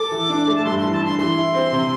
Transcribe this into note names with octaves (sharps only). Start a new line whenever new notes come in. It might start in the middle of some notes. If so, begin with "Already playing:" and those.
Already playing: A4 D6
E3
D4
A3
A5
G2 C6
E3 C6
A5
D4 C6
E3 C6
E4
C4
C3